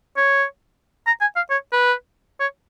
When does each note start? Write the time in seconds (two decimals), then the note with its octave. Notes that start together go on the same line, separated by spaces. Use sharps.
0.17 C#5
1.07 A#5
1.21 G#5
1.36 F5
1.50 C#5
1.73 B4
2.40 C#5